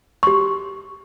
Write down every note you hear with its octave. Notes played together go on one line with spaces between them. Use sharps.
G4 C6 C#6